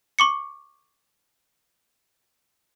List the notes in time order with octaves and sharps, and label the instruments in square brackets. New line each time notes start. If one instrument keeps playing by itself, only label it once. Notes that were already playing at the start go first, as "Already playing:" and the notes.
[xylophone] C#6 D6 C#7